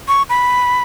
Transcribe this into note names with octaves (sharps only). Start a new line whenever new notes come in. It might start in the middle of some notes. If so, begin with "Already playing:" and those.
C#6
B5